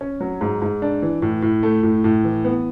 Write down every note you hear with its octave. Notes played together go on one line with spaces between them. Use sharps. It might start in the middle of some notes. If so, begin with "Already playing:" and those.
C#4
F#3
G#2
G#2
D4
E3
A2
A2
A3
A2
A2
E3
B3